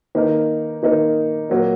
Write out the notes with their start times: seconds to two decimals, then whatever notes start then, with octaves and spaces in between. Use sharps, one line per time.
0.15 D#3 A#3 D#4 A#4
0.83 D#3 A#3 D#4 A#4
1.49 A#2 F#3 A#3